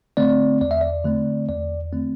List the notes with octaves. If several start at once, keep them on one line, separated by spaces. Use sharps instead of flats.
D3 A3 C4 D5
E2 D5
E5
D5
D3 A3 C4
E2 D5
D3 A3 C4